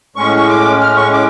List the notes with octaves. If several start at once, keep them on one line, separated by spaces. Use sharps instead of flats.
A2 G#3 C#4 C#6
C#6
D6
F6
C#6
D6